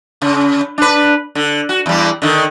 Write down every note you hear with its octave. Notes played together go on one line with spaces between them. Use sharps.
C#3
D4 B4
D3
F#4
E2 G3
D3 D#3